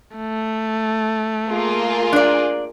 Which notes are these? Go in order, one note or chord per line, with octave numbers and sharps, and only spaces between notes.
A3
A#3 F4 G#4
D4 D5